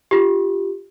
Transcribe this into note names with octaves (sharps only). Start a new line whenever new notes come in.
F4 G4